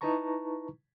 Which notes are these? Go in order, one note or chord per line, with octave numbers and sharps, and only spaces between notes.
D#4 E4 B4 A5 A#5 C#6